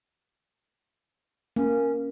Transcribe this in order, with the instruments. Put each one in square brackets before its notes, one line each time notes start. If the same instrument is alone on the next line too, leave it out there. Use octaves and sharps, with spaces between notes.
[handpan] A#3 [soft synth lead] C#4